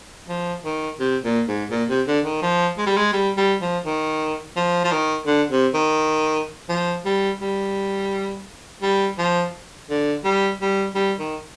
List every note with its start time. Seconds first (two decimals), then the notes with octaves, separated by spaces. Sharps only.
0.29 F3
0.64 D#3
1.00 C3
1.24 A#2
1.48 G#2
1.71 A#2
1.90 C3
2.07 D3
2.25 D#3
2.42 F3
2.78 G#3
2.87 G3
2.97 G#3
3.13 G3
3.37 G3
3.61 F3
3.85 D#3
4.56 F3
4.84 F3
4.92 D#3
5.26 D3
5.50 C3
5.74 D#3
6.69 F3
7.05 G3
7.41 G3
8.82 G3
9.19 F3
9.90 D3
10.24 G3
10.61 G3
10.95 G3
11.19 D#3